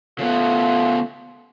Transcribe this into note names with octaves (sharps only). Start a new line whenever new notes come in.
C#3 A3 B3 F4